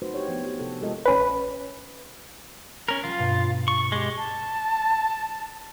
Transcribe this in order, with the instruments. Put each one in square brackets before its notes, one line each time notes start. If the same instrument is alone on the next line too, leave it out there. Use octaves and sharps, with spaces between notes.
[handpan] A3 D#4 F#4 B4 C5
D4 G4 C#5
F3 B3
G4
C3 A4
G#3 F4 G4 A4 A#4 D#5
[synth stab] A#1 C#4 B4
[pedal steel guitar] C#4 A#4
[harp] F#3 G3 [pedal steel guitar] F4
[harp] G2 B2
[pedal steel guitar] C#6
[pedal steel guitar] G#3 G4 [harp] B6
[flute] A5